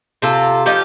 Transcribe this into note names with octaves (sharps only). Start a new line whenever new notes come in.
C3 F4 A4
F3 D#4 G4